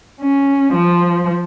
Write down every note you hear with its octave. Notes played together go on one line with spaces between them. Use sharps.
C#4
F3